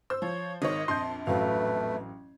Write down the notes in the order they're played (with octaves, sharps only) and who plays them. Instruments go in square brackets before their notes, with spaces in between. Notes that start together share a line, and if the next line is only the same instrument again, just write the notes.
[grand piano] C5 [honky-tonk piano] E6
[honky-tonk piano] F3 [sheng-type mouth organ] C#5
[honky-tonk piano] G#1 D#3 C#5 [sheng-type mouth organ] D#5
[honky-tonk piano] A#1 F2 [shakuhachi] A5 [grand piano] C6 G6
[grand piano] A1 F#3 F5 [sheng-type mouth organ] A3 [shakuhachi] B4